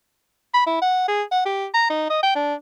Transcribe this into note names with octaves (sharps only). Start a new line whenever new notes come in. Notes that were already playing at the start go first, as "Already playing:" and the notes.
B5
E4
F#5
G#4
F#5
G4
A#5
D#4
D#5
G5
D4